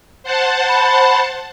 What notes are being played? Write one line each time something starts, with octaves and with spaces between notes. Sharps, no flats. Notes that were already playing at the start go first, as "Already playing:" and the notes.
C5 F#5 A5
B5